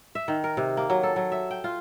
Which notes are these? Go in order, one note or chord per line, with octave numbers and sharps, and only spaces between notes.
E5
D#3
A#4
C3
A#3
F#3
A4
F#3
E5
G5
F4